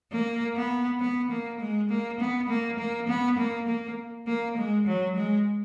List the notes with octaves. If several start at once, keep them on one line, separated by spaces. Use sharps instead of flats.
A#3
B3
B3
A#3
G#3
A#3
B3
A#3
A#3
B3
A#3
A#3
A#3
G#3
F#3
G#3